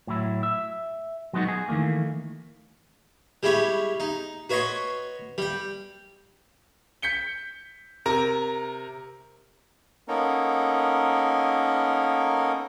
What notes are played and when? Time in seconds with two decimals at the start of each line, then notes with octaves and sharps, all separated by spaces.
0.07 A2 F#3 E4
0.43 E5
1.33 F#3 G#3 B3 D#4 F#4
1.48 G#4
1.68 D#3 E3 A3 A#3
3.43 G3 G#3 E4 G4 C#5
4.00 D#4
4.50 F#4 B4 C#5 D#5 C6 C#6
5.38 G3 G5
7.02 G6 B6 C#7 G7
8.06 C3 A#4 A#5
10.08 A#3 B3 C#4 D#4 A4 A#4